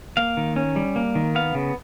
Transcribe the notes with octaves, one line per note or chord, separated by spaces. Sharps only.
A#3 F5
D#3
C#4
G3
A#3
D#3
B3 F5
C#3